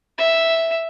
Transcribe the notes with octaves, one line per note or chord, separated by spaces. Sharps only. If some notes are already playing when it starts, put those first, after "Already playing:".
E5